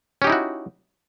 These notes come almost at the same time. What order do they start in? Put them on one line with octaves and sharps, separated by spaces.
C#4 G4 D#4 E4 F#4